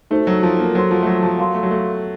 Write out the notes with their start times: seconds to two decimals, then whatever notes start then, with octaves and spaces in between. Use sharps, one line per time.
0.11 A3 D#4 F#4 A4 C5
0.27 F#3
0.43 F3
0.59 A#3
0.75 F#3 A4 C5 F#5 C6
0.91 F3
1.03 A3
1.07 F#3
1.23 F3
1.39 F#3 A#4 F5 C6
1.54 A3
1.63 F#3
1.71 A3